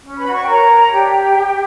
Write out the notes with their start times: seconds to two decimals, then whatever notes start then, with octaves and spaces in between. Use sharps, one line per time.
0.03 C#4
0.18 B4 B5
0.26 F#4
0.33 C#5 C#6
0.41 G5
0.48 A#4 C#5 A#5
0.69 C#5
0.91 D4 G4 G5